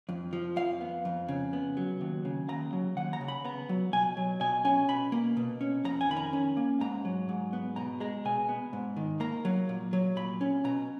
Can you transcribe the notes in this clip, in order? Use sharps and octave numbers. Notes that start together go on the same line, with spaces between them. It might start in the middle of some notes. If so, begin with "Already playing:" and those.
F2
F3
F2 F5
B3
F2
C#3
B3
F#3
D#2
C#3
D#2 A#5
F#3
D#2 F#5
A#5
C#3
B5
B3 A#5
F#3
B2 G#5
F#3
B2 G#5
C#4 G#5
B2 B5
A#3
B2
C#4
F2 A#5
G#5
D#3 B5
A#5
C#4
A#3
G#2 A#5
F#3
G#2
B3
B2 A#5
G#3 A#5
B2 G#5
B3
G#2
D#3
A#3 A#5
F#3
A#2
F#3
A#2 B5
C#4
B2 A#5